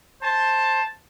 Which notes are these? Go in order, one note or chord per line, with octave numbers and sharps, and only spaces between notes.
C5 A5